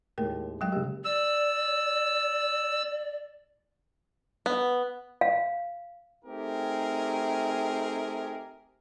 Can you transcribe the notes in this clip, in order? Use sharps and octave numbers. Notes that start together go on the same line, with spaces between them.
D#2 A2 G#3 A#4 G5
F#3 G#3 G5
C#3 G#3 A#3 G4
D5 E6
B3
F5
A3 C4 D#4 G4 G#4 A#4